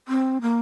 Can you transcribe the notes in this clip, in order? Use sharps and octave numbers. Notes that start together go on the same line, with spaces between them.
C4
A#3